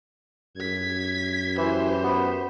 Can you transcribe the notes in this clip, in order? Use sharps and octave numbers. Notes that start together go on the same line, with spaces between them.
F#2 G#6 B6
E3 G4 C5
B3